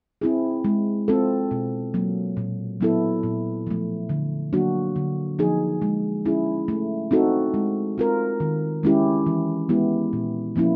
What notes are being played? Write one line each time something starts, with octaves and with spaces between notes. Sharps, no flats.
C4 E4 G#4
G#3
C4 F4 A4
B2
F#3 A#3
A#2
F#3 B3 E4 A4
A#2
F3 A3
D3
F#3 A#3 D4 F#4
D3
F3 A#3 D#4 G#4
G#3
C#4 E4 G#4
A3
C4 D#4 F#4 A4
G#3
C4 F4 A#4
D#3
G#3 C#4 E4 G4
E3
G#3 B3 E4 G4
A#2
F3 A#3 C#4 E4